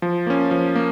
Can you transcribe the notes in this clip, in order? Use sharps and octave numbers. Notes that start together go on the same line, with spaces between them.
F3
A#3 C#4
F3
A#3